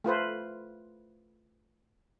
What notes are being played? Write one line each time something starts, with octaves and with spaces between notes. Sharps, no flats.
A3 F4 B4 C5